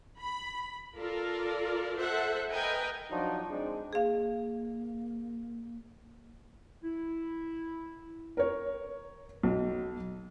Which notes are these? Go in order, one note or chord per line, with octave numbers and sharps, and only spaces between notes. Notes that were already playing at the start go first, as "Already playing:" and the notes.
B5
F4 A4 A#4 D5
A4 C5 E5 F#5
A#4 B4 D#5 G5 G#5
F3 F#3 D4 D#4
G#3 C4 D4 D#4
A#3 G#4 F5
E4
A#4 C#5
B1